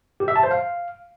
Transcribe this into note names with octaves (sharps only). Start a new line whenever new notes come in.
G4
E5
A5
C5
F5